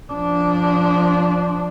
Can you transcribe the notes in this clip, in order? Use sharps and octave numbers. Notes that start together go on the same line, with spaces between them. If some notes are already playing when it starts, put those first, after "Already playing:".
F3 D4